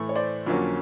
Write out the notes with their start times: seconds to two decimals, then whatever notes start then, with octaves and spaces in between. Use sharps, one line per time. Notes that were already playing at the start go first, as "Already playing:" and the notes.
Already playing: A2 E3 A3
0.09 C#5
0.16 C5 D5
0.47 F2 D3 F#3 A#3 C#4